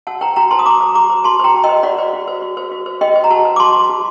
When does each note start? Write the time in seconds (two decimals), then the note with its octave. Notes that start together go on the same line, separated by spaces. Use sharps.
0.07 F#4 F#5 A5
0.21 C5 G5 A#5
0.36 F#4 G5 A#5
0.51 C5 A5 C6
0.59 D#6
0.66 F#4 A#5 D6
0.81 C5
0.95 F#4 A#5 D6
1.10 C5
1.24 F#4 A5 C6
1.39 C5 G5 A#5
1.54 F#4
1.63 D#5 G5
1.69 C5
1.83 F#4 D5 F#5
1.98 C5
2.13 F#4
2.28 C5
2.42 F#4
2.57 C5
2.71 F#4
2.86 C5
3.01 F#4 D#5 G5
3.16 C5
3.24 A#5
3.30 F#4 F#5 A5
3.45 C5
3.56 D6
3.60 F#4 A5 C6
3.75 C5
3.90 F#4